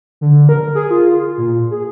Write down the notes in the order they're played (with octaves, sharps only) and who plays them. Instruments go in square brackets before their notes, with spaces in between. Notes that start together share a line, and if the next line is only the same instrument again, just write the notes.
[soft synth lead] D3
A#4
G#4
F4
A#2
G#4